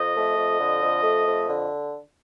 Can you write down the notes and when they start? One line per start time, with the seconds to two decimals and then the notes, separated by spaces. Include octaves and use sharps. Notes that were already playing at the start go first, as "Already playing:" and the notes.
Already playing: F2 D#5
0.15 A3
0.37 F2
0.59 D3
0.82 F2
1.03 A3
1.26 F2
1.49 D3